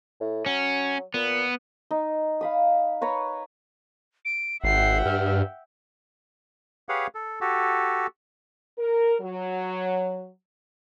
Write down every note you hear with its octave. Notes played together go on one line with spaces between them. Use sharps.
A2
F#3 C#4
A#2 B3
D#4
F5 B5 D#6
B4 C#5 A#5 C#6
D7
G#1 E5 F#5 G5 C7
G2 F6
G4 G#4 B4 C#5 F5 F#5
A4
F#4 G4 A4
A#4
F#3